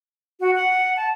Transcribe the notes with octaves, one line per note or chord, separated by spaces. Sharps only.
F#4
F#5
A5